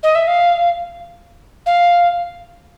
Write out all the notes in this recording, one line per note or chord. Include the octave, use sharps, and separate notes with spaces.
D#5
E5
F5
F5